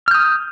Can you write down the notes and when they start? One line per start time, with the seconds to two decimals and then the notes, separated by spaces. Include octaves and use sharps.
0.08 F6
0.11 G6
0.14 D#6